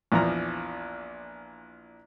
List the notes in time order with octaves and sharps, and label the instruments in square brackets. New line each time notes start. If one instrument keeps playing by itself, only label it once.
[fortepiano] A#1 E2 F3 A#5